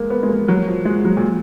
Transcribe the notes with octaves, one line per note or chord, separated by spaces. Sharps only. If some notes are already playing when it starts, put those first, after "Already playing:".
Already playing: G#3 A#3
B3
G#3
A#3
F#3
F3
G#3
F#3
A#2